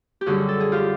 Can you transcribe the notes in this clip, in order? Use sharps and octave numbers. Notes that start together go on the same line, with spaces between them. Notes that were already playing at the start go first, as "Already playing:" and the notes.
G4
F#2 D3 G3 F#4 G#4
A4
G#4
F4 G4